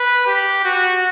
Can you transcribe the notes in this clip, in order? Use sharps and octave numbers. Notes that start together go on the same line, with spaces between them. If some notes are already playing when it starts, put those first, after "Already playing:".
Already playing: B4
G4
F#4